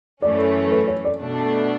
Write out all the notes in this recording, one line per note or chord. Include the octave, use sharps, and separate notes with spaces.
F#2 E3 A3 C#4 D5
B4
C#5
D5
B2 A3 D4